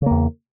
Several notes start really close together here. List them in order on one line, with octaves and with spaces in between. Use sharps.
C#3 A#3 E2